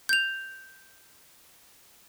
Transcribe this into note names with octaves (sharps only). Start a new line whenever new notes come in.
G6 F7